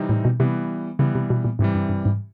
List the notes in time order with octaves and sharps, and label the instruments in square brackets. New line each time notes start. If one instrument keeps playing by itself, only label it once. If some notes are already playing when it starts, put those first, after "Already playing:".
Already playing: [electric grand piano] C3 E3 G3 C4 D#4
[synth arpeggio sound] A2
B2
[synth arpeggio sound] C3 [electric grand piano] E3 G3 B3
[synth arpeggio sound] C#3 [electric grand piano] E3 G3 B3
[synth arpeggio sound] C3
B2
A#2
[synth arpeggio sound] G#2 [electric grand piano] C3 E3 G3
[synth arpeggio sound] G2
G2
G#2